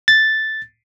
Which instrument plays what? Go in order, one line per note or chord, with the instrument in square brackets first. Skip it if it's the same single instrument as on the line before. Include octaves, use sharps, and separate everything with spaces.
[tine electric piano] A6